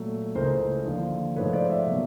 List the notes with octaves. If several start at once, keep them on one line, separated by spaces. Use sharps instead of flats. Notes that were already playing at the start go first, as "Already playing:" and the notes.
Already playing: A#2 F#3 A3
C#2 C#3 E3 A3 A#4 C5
D#2 D3 F3
G#2 F3 A3 B4 C#5
C5 D5
D5 E5
B2 F#3 A#3